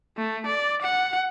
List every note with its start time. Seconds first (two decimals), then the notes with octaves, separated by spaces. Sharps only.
0.17 A3
0.47 D5
0.82 F#5